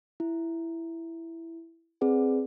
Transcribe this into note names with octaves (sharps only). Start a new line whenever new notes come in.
E4
C4 G#4 B4 D5 F#5